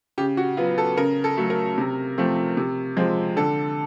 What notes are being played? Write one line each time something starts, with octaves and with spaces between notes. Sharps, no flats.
C#3 G4
F#4
F#3 B3 F4
A4
C#3 A#4
A4
F#3 A3
A#4
C3
F3 A3 C4
C3
F3 G#3 C4
D3 A4